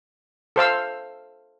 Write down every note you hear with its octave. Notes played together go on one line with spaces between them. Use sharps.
A4 C5 F5 E6